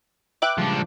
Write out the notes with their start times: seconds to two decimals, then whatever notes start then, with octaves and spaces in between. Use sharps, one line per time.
0.42 B4 E5 G5 D6 F#6
0.58 C#3 F3 G3 G#3 D4